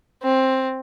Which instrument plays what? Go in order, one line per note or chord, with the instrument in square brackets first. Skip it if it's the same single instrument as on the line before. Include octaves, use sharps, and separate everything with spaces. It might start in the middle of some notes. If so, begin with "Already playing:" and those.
[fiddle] C4